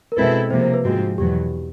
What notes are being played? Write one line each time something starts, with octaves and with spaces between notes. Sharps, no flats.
A#4
B2 G#3 C4 E4 A4 B4
C3 F3 A#3 C5
C5
B4
G#2 F3 G#3 C4 F#4
E2 B2 F#3 G4